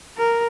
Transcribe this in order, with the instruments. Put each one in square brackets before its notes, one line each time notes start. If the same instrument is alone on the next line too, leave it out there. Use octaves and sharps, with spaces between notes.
[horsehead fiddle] A#4